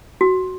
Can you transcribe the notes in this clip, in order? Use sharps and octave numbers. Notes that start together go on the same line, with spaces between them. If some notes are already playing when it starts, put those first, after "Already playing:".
F#4